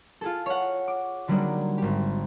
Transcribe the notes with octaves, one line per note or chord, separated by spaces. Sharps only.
F4 G#4 A4
C#5 F#5
D6
D3 F#3 G3 A#3 D4 D#4
G#1 G4